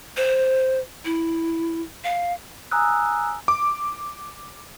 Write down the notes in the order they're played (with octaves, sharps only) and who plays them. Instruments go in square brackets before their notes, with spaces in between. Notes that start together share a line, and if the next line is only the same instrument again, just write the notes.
[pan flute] C5
E4
F5
[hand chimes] G#5 A#5 D#6 E6 F#6
[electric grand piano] D6